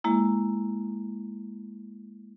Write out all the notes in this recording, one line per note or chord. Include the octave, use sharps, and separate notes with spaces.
G#3 A#3 E4